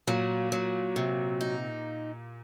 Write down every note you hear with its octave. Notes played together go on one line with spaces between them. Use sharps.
A#2 F#3
F#3
C3
D#4